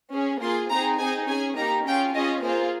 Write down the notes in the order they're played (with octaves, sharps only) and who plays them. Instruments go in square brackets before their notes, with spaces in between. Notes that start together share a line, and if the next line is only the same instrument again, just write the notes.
[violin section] C#4 G#4
A#3 F4 G#4 C6
C4 D#4 G#4 A#5
C4 D#4 G#4 G#5
C#4 G#4 G#5
A#3 D#4 G4 A#5
C#4 F4 G#4 G5
C#4 F4 G#4 D#5
A#3 F4 G#4 C5